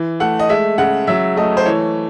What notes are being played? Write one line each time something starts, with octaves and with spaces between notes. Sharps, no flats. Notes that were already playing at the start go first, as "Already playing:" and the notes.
Already playing: E3
A3 F#5
D#5
G#3 E5
C#3 F#5
F#3 E5
A3 D#5
C5
E3 C#5